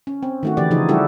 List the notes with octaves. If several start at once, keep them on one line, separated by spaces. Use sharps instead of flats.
C#4
C4
D#3 A3 F#4
D3 E3 A3 E4 G4 D5
C#3 F3 D#4 F4 G#4
G3 D4 E4 F#4 G4 A4